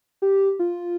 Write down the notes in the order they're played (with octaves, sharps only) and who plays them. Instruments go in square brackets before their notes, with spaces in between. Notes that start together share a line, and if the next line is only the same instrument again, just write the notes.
[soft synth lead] G4
F4